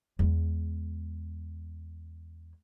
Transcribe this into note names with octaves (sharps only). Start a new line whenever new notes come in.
E2 G#3